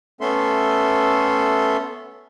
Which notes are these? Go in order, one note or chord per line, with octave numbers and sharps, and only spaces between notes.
A3 B3 C#4 A4 E5 C6